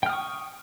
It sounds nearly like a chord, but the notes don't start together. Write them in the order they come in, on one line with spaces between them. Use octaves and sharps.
G5 F6 D#6 C#6